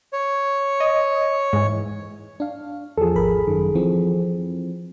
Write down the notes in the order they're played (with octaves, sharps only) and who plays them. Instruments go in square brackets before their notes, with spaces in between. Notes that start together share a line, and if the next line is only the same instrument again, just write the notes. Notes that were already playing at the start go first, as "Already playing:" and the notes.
[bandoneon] C#5
[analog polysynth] D#5
G#2 E3
[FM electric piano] D4 F5
[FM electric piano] E2 F3 [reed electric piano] G#4 A4
[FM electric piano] G#1 A#4 B5
F#2 D#3
E3 F3 C4